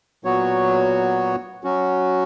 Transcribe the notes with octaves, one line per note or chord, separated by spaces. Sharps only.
A#2 F#3 B3 F#4 C#5
F#3 C#4 F#4